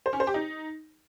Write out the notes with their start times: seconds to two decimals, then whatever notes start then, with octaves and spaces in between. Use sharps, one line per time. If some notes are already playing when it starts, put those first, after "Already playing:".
0.06 C5
0.13 C#4
0.20 C5
0.27 G4
0.34 D#4